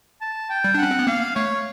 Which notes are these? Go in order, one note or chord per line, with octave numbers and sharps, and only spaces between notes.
A5
G5
G3
D4
C#4 F#5
C4
B3
A#3 F5
A3 C#5